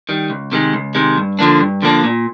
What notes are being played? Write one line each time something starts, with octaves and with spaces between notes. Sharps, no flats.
D#3 G3
C#2
C3 D#3 G#3
C#2
C3 D#3 G#3
G2
D3 F3 A#3 D4
G2
D3 F3 A#3 D4
A#2